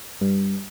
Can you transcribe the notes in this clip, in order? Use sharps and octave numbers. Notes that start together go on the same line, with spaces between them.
G2